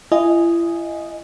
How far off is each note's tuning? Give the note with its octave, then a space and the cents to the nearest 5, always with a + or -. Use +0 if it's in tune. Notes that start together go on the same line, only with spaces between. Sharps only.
E4 +40 D#5 +0 G#5 +0